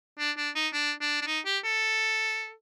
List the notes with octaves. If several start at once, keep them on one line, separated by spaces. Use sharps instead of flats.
D4
D4
D#4
D4
D4
D4
D#4
G4
A4